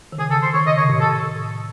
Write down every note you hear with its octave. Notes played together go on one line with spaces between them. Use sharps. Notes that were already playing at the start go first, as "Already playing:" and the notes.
D#3
C#3 G#4
A4
C5
D#3 C#5
C#3 D#5
C3 C#5
A2
A4